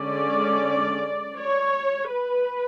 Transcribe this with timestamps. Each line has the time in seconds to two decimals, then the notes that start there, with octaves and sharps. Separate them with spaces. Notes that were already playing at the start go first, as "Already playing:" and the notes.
Already playing: D3 G#3 C#4 D5
1.38 C#5
2.11 B4